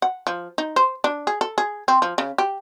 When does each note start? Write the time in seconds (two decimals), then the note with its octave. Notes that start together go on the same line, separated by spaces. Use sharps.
0.02 F#5
0.27 F3
0.58 D#4
0.76 C5
1.04 D4
1.27 G#4
1.41 A4
1.58 G#4
1.88 C4
2.02 F3
2.18 C#3
2.38 G4